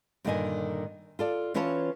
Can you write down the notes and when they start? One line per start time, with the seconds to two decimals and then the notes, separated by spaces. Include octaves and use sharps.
0.25 G2 A#2 D3 D#3 D#5 G#5
1.19 F4 A4 D5
1.54 E3 C#4 F4 B4 C#5 A5